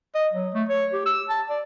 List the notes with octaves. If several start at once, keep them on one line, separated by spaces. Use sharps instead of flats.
D#5
F#3
A3
C#5
G4
E6
A5
D5